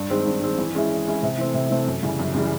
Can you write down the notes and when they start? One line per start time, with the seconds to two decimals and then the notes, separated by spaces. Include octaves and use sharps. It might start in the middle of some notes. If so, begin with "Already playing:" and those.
Already playing: G2
0.10 D#3 G#3 C4
0.26 G2
0.42 D#3 G#3 C4
0.58 E3
0.75 G#3 C#4 E4
0.91 E3
1.07 G#3 C#4 E4
1.23 C3
1.38 E3 A3 C4
1.54 C3
1.70 E3 A3 C4
1.87 F#2
2.03 C#3 E3 G3
2.19 F#2
2.34 C#3 E3 G3